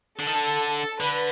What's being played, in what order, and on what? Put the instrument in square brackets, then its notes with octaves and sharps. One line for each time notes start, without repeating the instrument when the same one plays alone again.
[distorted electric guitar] D3 [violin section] A4
[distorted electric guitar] D#3
D3
[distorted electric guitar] D3 [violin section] B4